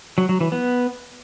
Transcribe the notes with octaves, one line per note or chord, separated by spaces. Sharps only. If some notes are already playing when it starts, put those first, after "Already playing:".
F#3
F#3
E3
B3